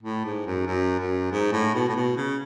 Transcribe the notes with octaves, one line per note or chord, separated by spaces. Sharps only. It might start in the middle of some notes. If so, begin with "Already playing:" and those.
A2
G#2
F#2
F#2
F#2
G#2
A2
B2
A2
B2
C#3